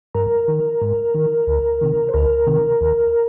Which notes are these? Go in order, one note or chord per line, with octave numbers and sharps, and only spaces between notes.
G2 A#4
D#3
G#2
D#3
D2
C3 D#3
C5
D2 A#4
C3 D#3
D#2